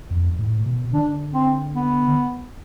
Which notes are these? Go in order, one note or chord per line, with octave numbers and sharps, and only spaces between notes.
F2
A2
B2
D3 D4
C4
B3